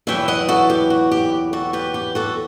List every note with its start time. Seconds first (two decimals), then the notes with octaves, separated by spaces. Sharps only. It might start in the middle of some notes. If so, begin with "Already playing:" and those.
0.07 E2 B2 F#3 B3 E4 E5 G5
0.28 D#5 F#5
0.49 F#4 A4
0.70 G4
0.90 F#4
1.11 G4
1.53 F#4 A4
1.73 G4 B4
1.94 G4
2.15 F#4 A4